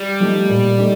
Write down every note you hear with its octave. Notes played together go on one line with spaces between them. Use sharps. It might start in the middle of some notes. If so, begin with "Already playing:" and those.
Already playing: G3
F3 A3 D#4 G4
A#2
A3 D#4 G4